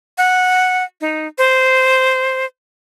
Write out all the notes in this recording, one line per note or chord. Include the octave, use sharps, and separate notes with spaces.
F#5
D#4
C5